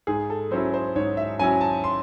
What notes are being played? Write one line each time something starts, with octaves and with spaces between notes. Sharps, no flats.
G#2 G#4
A4
F#3 C#4 E4 C5
C5
G#2 C#5
E5
F#3 C#4 E4 G#5
A5
C6